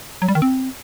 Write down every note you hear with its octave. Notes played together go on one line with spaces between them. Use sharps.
F#3
G3
D#3
C4